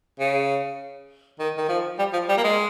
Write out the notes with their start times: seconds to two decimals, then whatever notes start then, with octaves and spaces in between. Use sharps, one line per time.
0.20 C#3
1.39 D#3
1.58 D#3
1.69 F3
1.99 G3
2.13 F3
2.29 G3
2.37 A#3
2.44 G#3